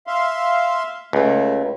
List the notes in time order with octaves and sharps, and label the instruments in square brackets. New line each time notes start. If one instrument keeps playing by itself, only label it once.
[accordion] E5 F5 C6
[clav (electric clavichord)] C#2 [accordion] A3